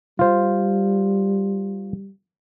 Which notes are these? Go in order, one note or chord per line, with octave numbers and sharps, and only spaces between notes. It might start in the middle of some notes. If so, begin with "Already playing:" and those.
G3 F4 C5